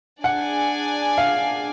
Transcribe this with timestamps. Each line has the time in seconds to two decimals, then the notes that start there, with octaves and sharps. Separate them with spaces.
0.23 D4 G#4 D5 F#5 G#5
1.18 F5